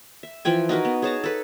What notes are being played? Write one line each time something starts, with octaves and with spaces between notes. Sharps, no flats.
E5
E3 F3 G5 G#5
D#4 F#4 A#4 B4
B3
G#4 C#5 A5 A#5
A4 B4